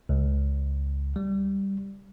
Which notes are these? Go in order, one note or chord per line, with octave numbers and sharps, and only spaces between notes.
C#2
G3